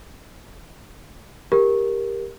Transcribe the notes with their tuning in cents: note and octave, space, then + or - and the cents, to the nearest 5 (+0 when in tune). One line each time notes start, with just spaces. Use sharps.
G4 +15 A#4 +10